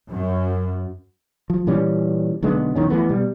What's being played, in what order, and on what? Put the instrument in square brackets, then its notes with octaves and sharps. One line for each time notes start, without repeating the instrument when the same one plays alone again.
[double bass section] F#2
[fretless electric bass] F3
A#2 E3 G3 C#4
B1 D3 G#3 B3
B1 E2 D#3 C#4
E3 F#3 A3 B3
B2 G3